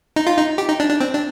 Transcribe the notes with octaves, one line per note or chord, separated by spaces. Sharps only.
D#4
F4
D#4
G4
D#4
D4
D4
C4
D4